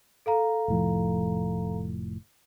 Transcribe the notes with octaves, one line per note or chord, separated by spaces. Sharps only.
A4 F5 A#5
F1 A2 F3